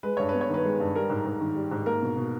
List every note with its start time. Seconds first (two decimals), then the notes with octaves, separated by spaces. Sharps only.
0.03 G#3 B4
0.17 G2 C#5
0.29 B4
0.34 B3
0.41 C#5
0.49 D#3 B4
0.65 G#3
0.80 G2
0.95 G3 A#4
1.10 G#2
1.26 G#2
1.41 D#3
1.55 G3
1.71 G#2
1.86 A#3 A#4
2.02 B2
2.17 B2